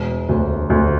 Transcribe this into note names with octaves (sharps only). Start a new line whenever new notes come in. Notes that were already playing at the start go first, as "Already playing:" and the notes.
Already playing: E1
D2
D2